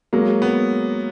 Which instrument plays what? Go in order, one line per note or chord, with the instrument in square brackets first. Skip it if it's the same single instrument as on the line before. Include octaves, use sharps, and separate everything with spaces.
[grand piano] F#3 [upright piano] G#3 A#3
[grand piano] B3